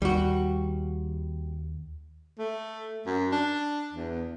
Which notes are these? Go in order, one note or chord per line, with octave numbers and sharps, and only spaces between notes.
D#2 G3 F#4
A3
F#2
D4
E2